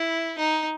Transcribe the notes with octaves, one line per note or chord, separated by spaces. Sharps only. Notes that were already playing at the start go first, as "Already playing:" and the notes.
Already playing: E4
D#4